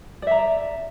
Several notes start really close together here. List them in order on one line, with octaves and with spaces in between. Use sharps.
D5 E5 A#5